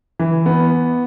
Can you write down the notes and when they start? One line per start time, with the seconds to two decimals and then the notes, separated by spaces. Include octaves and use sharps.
0.19 E3
0.46 B3